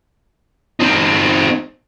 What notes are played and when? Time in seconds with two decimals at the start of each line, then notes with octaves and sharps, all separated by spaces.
0.80 C4 D#4